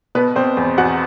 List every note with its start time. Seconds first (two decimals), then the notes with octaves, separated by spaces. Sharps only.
0.15 B2 B3 B4
0.36 B2 C4 C5
0.57 E2
0.78 E2 F#4 F#5